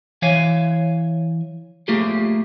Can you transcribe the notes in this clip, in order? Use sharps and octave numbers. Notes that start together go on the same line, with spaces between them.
E3 C#5 E5 F5 G#5
A3 A#3 F4 G4 G#4